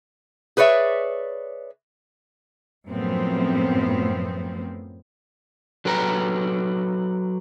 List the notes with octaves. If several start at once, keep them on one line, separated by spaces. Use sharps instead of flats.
G#4 B4 C#5 D5 E5
F#2 A2 F3 B3 C4
F#3 A4 B4 G5 A#5